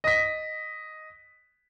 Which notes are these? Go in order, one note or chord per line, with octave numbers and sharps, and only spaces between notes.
D#5 B6